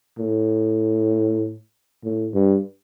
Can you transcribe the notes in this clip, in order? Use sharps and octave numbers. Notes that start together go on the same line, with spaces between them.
A2
A2
G2